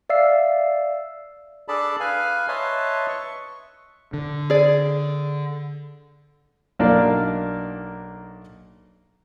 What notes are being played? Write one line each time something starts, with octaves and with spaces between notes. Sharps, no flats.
D5 E5 F5 E6 C7
D4 G#4 A4 D5 A5 B5
B4 F5 G#5
B4 C#5 D#5 E5 A5 C6
C#6
D3
G#4 D5
B1 A#3 D4 D#4 A#4 D5